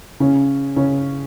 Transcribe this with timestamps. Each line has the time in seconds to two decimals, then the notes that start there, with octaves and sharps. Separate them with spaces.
0.20 C#3 C#4
0.76 C#3 C#4